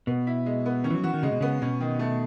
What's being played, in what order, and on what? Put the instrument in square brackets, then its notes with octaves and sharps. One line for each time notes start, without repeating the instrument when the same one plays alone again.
[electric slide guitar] B2 [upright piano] B3
[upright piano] E4
G#3
B3
[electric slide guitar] D#3 [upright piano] C#4
[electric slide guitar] E3
F#3
[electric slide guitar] E3 [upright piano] F#4
[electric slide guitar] D#3
[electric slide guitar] C#3 [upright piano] G#3
[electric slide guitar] B2
[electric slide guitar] C#3 [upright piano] B3
[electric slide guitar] B2 [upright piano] C#4
[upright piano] D#3
A3